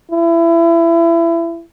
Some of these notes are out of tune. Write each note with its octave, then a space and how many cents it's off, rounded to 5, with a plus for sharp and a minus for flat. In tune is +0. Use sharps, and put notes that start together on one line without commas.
E4 +25